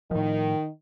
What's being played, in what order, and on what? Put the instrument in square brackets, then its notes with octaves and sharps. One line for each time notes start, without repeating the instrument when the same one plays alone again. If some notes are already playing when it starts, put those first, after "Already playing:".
[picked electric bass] A2 F3 [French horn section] D#3